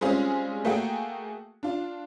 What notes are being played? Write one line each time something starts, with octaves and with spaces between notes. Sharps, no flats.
G3 G#3 C4 C#4 F4 G#4
A3 A#3 F#4 G#4 G5
D4 F4